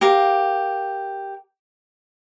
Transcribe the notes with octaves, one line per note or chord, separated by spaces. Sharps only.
G4 A#4 F5